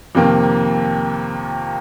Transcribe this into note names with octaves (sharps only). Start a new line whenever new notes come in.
F2 C3 D#3 A#3